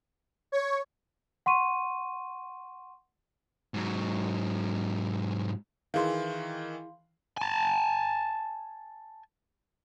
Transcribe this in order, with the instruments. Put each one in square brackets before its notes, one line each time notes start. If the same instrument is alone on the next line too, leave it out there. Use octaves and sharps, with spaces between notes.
[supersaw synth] C#5
[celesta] F#5 C6 C#6 D#7
[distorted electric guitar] G#2 F#3
[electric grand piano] D#3 E3 [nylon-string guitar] E4 G#4 [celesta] F5 C6
[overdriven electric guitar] G#5 A5